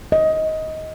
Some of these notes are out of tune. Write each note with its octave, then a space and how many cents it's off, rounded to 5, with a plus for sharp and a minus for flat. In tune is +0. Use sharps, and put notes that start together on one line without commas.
D#5 +15